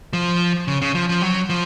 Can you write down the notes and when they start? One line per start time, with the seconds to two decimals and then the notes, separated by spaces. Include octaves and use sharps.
0.13 F3
0.68 C#3
0.82 C#3
0.95 F3
1.09 F3
1.22 F#3
1.49 F3